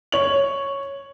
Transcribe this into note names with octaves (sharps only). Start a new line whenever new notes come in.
C#5 F#7